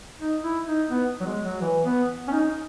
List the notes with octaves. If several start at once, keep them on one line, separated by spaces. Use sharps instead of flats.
D#4
E4
D#4
B3
F#3
G#3
F#3
E3
B3
C#4
D#4